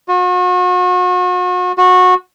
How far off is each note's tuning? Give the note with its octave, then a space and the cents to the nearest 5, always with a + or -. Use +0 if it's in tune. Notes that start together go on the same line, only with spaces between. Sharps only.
F#4 -40
F#4 -20